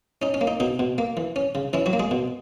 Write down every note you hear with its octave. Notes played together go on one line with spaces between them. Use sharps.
C#4 D#4
C#4
A#3
D#4
B2 D#4
B2
A#3
E3
C#4
C#3
E3 C#4 E4
F#3 F#4
A#3
G#3 G#4
B2